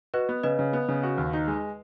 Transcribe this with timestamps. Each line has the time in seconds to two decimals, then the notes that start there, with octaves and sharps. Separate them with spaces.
0.14 F#4 B4 D#5
0.29 B3
0.43 C#3 B4 D#5
0.59 C#3
0.73 B3
0.88 C#3
1.03 F#4
1.18 D#2
1.33 D#4
1.48 G#3